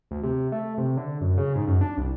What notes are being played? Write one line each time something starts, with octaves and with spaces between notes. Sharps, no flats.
D2
C3
A3
C3
D3
F#2
C#3
G#2
F#2
D4
C2